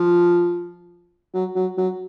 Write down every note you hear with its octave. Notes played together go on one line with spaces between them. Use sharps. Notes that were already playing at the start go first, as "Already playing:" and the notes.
Already playing: F3
F#3
F#3
F#3